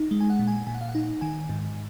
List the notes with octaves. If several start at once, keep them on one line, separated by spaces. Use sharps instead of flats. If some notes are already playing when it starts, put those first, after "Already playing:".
Already playing: D#4
G#3
G#5
F#5
A#2
G#5
A#2 G#5
F#5
F5
F#5
D#4
D#3 G#5
G#2